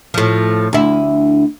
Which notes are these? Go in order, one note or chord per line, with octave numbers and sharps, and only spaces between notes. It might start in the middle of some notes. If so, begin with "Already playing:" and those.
A2 F3
D2 E4